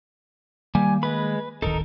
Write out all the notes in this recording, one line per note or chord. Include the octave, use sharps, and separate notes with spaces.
D#3 G3 A#3 G#5
G#3 B4 B5
D1 G#1 D#3 D#4 A4 A#4